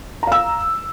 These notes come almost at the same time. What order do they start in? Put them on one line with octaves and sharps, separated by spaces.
A#5 F5 E6